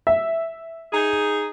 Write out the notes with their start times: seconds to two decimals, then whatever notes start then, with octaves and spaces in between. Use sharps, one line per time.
0.07 E5
0.93 D#4 G#4